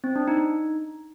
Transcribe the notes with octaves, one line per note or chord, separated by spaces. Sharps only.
C4
D4
D#4